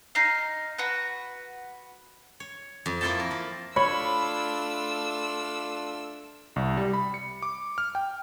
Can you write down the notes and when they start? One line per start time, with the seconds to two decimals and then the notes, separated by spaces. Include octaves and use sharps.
0.15 D#4 F5
0.78 F#4 B4
2.40 C#5
2.86 F2
3.01 A#3 E4 F4 A4 G5 A5
3.20 A#4
3.31 F3
3.76 A3 D4 F4 C#5 B5 E6
6.56 C2
6.77 G3
6.93 B5
7.14 C#7
7.42 D6
7.78 F6
7.95 G5